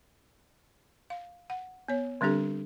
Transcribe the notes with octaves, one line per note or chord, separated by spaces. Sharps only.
F5
F#5
B3 C#5
D3 G3 C4 D4 G4 A4